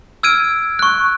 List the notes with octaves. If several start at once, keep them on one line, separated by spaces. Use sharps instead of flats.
E6 F6 G#6 D7 D#7
C#6 F#6